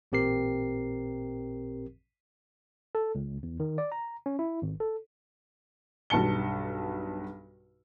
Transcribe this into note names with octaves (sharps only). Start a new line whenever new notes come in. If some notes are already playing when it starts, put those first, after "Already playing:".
A1 A#2 C4 G4 A#4 C7
A4
C#2
E2
D#3
D5
A#5
C#4
E4
G#1
A4
B1 G2 A5 C#7 G7